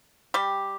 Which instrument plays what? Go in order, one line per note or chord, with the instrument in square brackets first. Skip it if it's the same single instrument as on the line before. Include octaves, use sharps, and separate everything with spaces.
[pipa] G3 G4